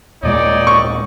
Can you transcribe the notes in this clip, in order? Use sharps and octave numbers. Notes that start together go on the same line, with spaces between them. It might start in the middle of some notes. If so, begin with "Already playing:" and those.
D#2 A#2 G#3 D#4 C#5 D5
C#6